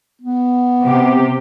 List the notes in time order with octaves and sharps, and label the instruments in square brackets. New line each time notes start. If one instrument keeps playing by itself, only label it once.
[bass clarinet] B3
[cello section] C3 G4